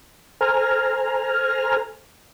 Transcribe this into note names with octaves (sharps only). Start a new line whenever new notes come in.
A4 C5 G#5 A#5 F6